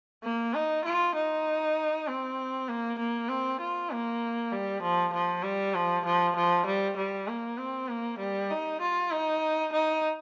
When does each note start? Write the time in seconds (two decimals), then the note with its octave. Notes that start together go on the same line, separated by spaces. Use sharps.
0.24 A#3
0.54 D#4
0.85 F4
1.16 D#4
2.08 C4
2.69 A#3
2.99 A#3
3.29 C4
3.60 F4
3.92 A#3
4.52 G3
4.82 F3
5.13 F3
5.43 G3
5.75 F3
6.05 F3
6.36 F3
6.66 G3
6.97 G3
7.28 A#3
7.58 C4
7.89 A#3
8.19 G3
8.51 D#4
8.81 F4
9.12 D#4
9.73 D#4